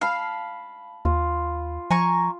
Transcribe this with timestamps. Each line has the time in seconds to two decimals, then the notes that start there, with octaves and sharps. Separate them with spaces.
0.01 F5 A5 B5
1.05 D#2 F4
1.91 F3 G#5 A#5 C#6